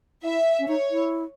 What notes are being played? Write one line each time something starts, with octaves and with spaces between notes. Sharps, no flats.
E4 E5
C#4
D#4 C#5
E4